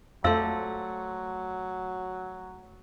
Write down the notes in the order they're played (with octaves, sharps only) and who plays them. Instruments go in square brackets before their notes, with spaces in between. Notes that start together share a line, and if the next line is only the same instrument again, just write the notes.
[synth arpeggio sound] F2 [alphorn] F#3 [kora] A3 C5 D5 [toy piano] F5 E6